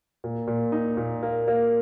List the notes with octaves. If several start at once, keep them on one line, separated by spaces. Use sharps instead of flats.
A#2
A#2
D#4
A#2
A#3
A#3